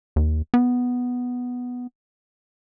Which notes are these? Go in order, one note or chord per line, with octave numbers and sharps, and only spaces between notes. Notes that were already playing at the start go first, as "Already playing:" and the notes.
D#2
B3